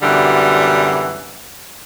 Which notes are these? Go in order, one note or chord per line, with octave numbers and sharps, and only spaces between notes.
F#2 B2 D3 E3 G3